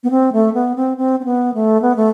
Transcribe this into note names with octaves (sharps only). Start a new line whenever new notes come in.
B3
C4
A3
B3
C4
C4
C4
B3
A3
B3
A3